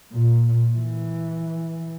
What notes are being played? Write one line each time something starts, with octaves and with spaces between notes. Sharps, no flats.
A#2
E3